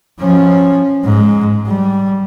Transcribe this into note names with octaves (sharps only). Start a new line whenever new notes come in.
F3 C#4
G#2 G#3
G3